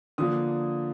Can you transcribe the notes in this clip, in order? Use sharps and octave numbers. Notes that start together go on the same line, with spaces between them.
D3 F3 A#3 D4 D#6